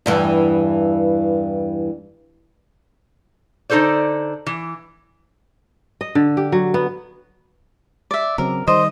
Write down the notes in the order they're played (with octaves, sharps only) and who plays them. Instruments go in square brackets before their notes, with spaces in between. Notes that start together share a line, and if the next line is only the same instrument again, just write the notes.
[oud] E2 G2 E3
[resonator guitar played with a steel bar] D3 D#4 F4 A4 C5 D5
E3
[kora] D#5
D3
G4
F#3
B3
[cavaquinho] D5 E5
[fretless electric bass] C#3 F#3 C4 [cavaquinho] A#4
[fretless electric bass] D#3 G3 [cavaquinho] C5 [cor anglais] D#5